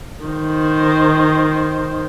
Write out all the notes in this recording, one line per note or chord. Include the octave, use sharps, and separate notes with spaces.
D#3 C5